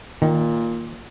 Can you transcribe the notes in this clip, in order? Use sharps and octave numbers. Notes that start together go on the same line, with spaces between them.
A#2 D#3